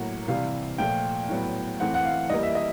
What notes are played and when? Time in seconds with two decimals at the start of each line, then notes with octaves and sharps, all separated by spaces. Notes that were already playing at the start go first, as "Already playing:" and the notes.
Already playing: A2 F#3 A#3 F#5
0.28 C3 E3 G3 F5
0.78 A#2 F3 A3 G5
1.29 A2 F#3 B3
1.80 E3 A3 C4 F#5
1.94 F#5
2.05 F5
2.30 E3 G3 A#3 D#5
2.43 E5
2.55 D#5